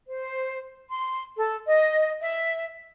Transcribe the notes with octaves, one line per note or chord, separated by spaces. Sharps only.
C5
C6
A4
D#5
E5